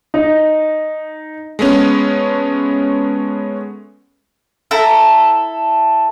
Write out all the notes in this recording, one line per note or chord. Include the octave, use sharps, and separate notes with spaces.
D#4
G#3 A3 B3 C#4
E4 A4 A#5